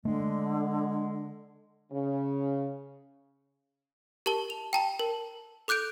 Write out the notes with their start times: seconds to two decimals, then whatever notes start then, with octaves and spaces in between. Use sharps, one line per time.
0.05 D3 G#3 A3 D4
1.92 C#3
4.26 G4 A#4 A5 G7
4.50 F7
4.73 G5 A5 A#5
4.99 A#4
5.68 A4 D6 F#6 G6 D7